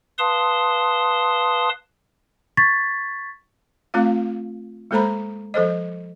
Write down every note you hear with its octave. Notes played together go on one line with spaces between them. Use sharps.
B4 F5 A5 C6 D#6
C#6 G#6 A6 B6
A3 C4 F4 F5
G#3 A#3 A4 C5 A#5 B5
F3 A4 C5 D#5